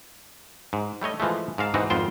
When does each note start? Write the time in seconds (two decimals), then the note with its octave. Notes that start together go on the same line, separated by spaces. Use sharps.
0.73 G#2
1.02 G3 A3 C#5 D#5
1.20 E3 F3 G#3 A3
1.58 G#2 A#4 F5 A5
1.74 G#2 E3 A#3 C4 D#4 F#4
1.90 G#1 F2 B3 F4 C5 G5